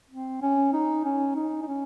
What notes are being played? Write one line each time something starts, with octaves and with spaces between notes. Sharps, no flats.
C4
C#4
D#4
C#4
D#4
D#4
C#4